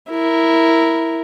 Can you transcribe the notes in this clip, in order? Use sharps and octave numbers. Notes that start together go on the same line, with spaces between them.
E4 A#4